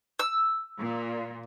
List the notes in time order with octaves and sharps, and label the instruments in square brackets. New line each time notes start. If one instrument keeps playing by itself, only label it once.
[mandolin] E6
[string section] A#2